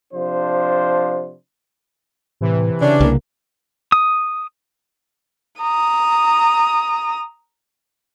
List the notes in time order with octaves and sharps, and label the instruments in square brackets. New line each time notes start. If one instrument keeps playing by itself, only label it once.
[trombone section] C3 F3 D4 C5
[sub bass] A2 [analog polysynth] C3 E3
[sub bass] C#3 [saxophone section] C#4 D4
[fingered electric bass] C2 A#3
[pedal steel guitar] D#6
[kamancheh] A#5 D#6